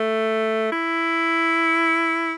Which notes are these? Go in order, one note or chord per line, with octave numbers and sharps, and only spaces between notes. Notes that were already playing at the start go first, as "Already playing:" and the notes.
Already playing: A3
E4